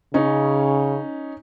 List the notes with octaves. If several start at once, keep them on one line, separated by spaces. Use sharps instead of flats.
C#3 C#4 D#4